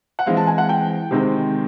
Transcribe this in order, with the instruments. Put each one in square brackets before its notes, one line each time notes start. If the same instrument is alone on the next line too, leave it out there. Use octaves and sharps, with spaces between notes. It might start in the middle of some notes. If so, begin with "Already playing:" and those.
[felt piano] F#5
E3 G#3 C4 F5
A5
G#5
F#5
G5
C3 D#3 G#3 C4